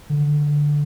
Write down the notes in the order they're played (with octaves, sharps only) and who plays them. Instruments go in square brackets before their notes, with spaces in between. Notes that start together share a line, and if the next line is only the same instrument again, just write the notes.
[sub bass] D3